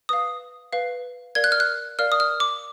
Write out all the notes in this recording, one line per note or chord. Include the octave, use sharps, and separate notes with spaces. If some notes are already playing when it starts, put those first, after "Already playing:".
B4 F5 D#6
B4 F5
A#4 D5 F5 G#6
F#6
F6
F#6
A#4 D5 F5 F6
D#6
F6
D6